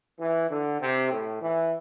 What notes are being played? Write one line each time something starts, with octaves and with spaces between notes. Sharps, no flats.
E3
D3
C3
A2
E3